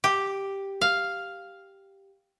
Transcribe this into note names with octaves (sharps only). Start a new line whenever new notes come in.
G4
F5